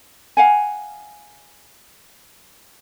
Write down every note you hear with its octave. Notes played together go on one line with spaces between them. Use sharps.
F5 F#5 G#5